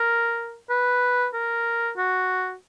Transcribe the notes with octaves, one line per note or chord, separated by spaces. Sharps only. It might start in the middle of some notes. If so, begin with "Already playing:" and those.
Already playing: A#4
B4
A#4
F#4